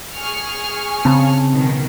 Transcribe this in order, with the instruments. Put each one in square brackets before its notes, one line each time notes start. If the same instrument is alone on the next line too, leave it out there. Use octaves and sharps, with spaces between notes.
[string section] G#4 C#6 F6
[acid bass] C#3 [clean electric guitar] C4 A5
[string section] B2 D#3 F#3